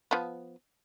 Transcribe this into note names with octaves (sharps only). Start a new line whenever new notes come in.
F3 B3